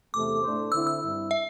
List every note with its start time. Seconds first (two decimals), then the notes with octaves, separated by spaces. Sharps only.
0.14 E2 C3 A3 D6
0.43 A2 A3 D4 C5
0.72 D3 C4 E4 E6
0.87 E6
1.01 G2 G3 C4 E4
1.31 E5